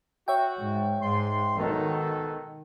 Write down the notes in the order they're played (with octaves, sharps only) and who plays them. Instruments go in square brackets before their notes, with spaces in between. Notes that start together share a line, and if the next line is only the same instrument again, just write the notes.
[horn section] F#4 [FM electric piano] C#5 E5 G5
[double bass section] G#2
[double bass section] G#2 [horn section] C6
[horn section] B2 F#4 A4 [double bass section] D#3